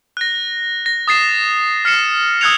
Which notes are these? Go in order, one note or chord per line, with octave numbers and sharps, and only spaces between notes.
F#6 A#6
A#6
D#6 A6 C7 E7
F6 C7 C#7 E7
D#6 E6 F#6 G#6 C#7 F7